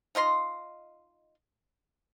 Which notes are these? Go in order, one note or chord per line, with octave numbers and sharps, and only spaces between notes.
D#4 F4 D#5 C6